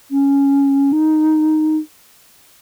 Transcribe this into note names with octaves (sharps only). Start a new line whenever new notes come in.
C#4
D#4